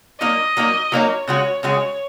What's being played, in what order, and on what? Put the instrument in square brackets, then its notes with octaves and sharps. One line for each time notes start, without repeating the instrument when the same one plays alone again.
[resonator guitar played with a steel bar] F#3 A#3 D#4 [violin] D#5
[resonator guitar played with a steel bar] F#3 A#3 D#4
[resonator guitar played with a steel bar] F#3 A#3 D#4 [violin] C#5
[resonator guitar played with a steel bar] C#3 G#3 F#4 [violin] C#5
[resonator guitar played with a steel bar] C#3 G#3 F#4 [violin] C#5